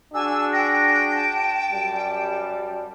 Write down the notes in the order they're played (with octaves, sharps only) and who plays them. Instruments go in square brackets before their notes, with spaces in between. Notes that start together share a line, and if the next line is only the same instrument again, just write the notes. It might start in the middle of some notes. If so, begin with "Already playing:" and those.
[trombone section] D4 F#4 G#4 [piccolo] G#5 [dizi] E6
[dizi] G5 [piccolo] A#6
[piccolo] A5
[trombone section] F#2 G3